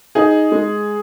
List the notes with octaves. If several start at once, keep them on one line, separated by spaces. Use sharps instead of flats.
D#4 G#4
G#3